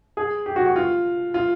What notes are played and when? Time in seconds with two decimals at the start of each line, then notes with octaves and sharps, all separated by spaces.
0.17 G#4
0.46 G4
0.56 F#4
0.66 F#4
0.76 F4
1.34 F4